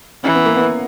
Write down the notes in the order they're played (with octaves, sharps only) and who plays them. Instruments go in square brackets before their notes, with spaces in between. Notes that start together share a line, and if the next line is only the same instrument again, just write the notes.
[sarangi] E3 [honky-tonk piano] C#4
[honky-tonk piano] B3
A#3
B3